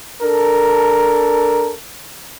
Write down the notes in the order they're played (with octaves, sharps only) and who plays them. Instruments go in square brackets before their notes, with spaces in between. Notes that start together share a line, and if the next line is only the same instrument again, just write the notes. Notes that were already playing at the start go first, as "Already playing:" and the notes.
[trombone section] D4 A4 A#4